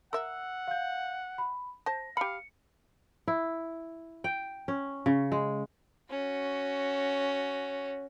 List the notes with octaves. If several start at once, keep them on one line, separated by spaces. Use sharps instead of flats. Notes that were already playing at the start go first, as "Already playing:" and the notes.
A#4 E5 F#5 E6
F5 G6
B5
C5 A5 A#6
G4 F5 B5 C#7
E4
G5
C#4
C#3
G#3
C#4 F#4